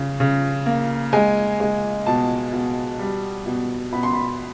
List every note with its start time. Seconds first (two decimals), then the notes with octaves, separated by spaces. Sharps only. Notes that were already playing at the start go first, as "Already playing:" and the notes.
Already playing: C#3
0.20 C#3
0.66 A#3
1.13 G#3 G#5
1.60 G#3
2.06 B2 A5
2.53 B2
2.99 G3
3.46 B2
3.92 B2 B5
4.03 C6
4.13 B5